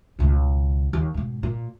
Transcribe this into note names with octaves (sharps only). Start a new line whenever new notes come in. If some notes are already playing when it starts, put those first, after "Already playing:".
C#2 B2
D#2
G#2 B2
A#2